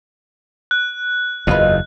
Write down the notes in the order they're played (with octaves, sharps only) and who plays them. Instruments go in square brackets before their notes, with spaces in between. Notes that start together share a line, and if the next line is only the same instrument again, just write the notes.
[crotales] F#6
[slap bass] F#1 E2 [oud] D#4 F4 B4